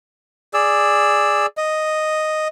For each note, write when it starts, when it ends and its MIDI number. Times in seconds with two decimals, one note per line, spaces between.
0.54 1.46 68
0.54 1.46 74
0.54 1.46 88
1.57 2.48 75